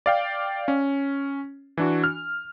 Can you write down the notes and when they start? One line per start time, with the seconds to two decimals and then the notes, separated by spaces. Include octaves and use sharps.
0.06 D5 F5 G5
0.68 C#4
1.77 E3 D4 F#4
2.04 F6